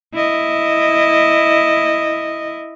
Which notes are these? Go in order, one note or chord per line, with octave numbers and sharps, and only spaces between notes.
E4 D#5